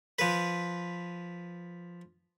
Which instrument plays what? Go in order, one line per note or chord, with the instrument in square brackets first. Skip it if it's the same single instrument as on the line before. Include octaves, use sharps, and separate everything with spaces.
[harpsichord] F3 B4